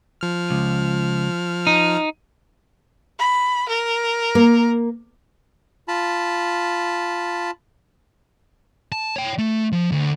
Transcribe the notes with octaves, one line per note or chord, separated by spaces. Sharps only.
F3 F6
C#2
D#4
B5
A#4
A#3
F4 A5 B5
A5
C#5 G5
A3
F3
D2